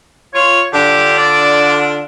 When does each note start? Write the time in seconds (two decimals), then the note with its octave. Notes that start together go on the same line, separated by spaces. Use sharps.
0.34 F4 C#5
0.73 D3 D4 F4 G4
1.18 D5